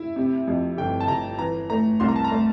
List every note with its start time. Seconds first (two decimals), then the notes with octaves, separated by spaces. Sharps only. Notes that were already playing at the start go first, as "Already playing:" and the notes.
Already playing: E4
0.16 C3
0.47 F2
0.77 G1 G5
1.01 A5
1.08 G1 A#5
1.39 E3 A#5
1.70 A3 A#5
2.00 C2 C6
2.08 A#5
2.16 A5
2.25 A#5
2.31 A3